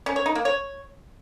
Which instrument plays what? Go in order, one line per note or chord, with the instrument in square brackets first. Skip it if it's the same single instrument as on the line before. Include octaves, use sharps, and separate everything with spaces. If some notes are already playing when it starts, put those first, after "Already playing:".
[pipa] C#4
C#5
D#4
A#3
C#5